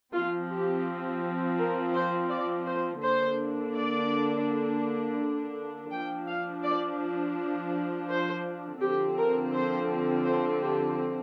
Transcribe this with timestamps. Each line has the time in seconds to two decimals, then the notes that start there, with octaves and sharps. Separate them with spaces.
0.13 F3 C4 F4
0.49 G4
1.58 A#4
1.93 C5
2.29 D5
2.66 C5
3.02 D3 A#3 D4 C5
3.74 D5
5.91 F3 D4 G5
6.27 F5
6.63 D5
8.09 C5
8.80 D3 F3 C4 G4
9.17 A#4
9.53 C5
10.24 C5
10.62 G4